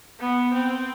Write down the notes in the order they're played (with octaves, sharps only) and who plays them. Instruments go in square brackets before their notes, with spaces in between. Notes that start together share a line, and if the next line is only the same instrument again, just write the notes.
[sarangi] B3
C4